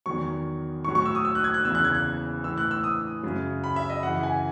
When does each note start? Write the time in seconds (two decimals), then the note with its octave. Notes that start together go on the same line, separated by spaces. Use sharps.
0.06 E2 D#3 F#3 C#6
0.85 A2 F#3 C#6
0.95 C#6
1.06 E6
1.15 D#6
1.25 E6
1.35 F#6
1.44 G#6
1.54 F#6
1.64 E2 C#3 E3 E6
1.75 F#6
1.84 G#6
1.94 F#6
2.44 A2 E3 E6
2.58 F#6
2.71 E6
2.84 D#6
3.23 F#2 C#3 F#3
3.64 B5
3.76 E5
3.90 D#5
4.03 F#2 C#3 E3 F#5
4.23 G#5